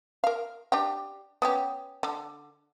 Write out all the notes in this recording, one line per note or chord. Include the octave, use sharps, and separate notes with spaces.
A#4 F5
D4 G4 G5
B3 C#4 G4
D3